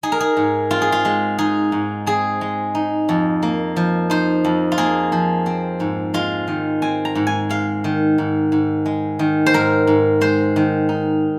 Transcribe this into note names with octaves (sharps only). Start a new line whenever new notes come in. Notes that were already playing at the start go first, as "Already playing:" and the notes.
D#4 G#4
A#4
G#4
G#2
C4 F4
G#4
F4
G#3
D#4 G#4
G#2
C4 G#4
G#3
D#4
F2
A#3
F3
D#4 C5
F2
F4
A#3 G#4
F3
C4
G#2
G#3 F4
D#3
C4 G#5
A#5
G#2
G#5
G#3 F5
D#3
G#2
G#2
G#3
D#3
C5
G#2 A#4
G#2
G#3 C5
D#3
D#4